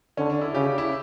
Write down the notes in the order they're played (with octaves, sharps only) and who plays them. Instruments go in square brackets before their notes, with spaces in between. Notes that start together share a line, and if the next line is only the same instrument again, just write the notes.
[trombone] D3 [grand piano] C#4
[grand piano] D4
E4
[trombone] C#3 [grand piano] G4
[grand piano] G4
E4